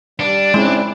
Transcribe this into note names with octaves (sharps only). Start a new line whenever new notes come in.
G3 D4
G#3 C4 C#4 E4